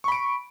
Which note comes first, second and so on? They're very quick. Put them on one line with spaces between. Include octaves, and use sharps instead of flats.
C#6 B5 D7